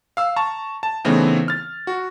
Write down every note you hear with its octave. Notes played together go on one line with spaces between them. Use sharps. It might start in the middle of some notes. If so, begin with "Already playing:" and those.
F5 E6
A5 A#5 C#6
A5
C#3 E3 A3 B3 C4 D#4
F6 A6
F#4